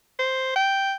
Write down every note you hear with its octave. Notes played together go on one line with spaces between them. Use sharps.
C5
G5